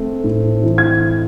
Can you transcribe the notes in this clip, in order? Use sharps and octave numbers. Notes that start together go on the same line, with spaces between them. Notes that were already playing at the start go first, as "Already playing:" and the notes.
Already playing: A3 C4
A2
E3
G#6